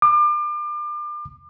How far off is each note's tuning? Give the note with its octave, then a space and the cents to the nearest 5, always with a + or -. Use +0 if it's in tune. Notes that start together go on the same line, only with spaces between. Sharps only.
D6 +35